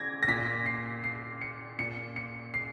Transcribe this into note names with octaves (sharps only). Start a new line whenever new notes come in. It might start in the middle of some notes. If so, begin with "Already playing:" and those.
Already playing: G#6 A#6
A#6
A#2 B6
C7
C7
C#7
A#2 C#7
C#7
C7